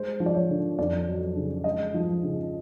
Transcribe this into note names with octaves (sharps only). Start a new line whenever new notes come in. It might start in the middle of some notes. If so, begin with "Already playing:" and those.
Already playing: G#3 C5
F3
D5
C#5
D3
F2 D5
F#3
C#3
G#3 D#5
F3
C#3